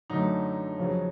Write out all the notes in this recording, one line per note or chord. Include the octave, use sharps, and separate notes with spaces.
F#2 D3 F#3 A3 D#4
F2 C#3 F#3